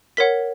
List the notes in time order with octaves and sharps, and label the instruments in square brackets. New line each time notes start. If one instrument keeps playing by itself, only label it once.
[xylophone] A#4 C#5 F#5 B6